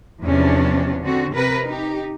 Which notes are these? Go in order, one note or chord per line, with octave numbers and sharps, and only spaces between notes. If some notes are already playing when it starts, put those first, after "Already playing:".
E2 C3 F3 C#4 D4
D3 C4 F#4
C3 A#4 B4
D#4 G4